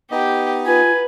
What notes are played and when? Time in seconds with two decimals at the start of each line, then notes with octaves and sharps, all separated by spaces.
0.11 B3 D#4 G4 D#5
0.66 F4 B4 G#5